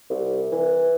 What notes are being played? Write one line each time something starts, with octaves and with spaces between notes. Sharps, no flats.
C2
E3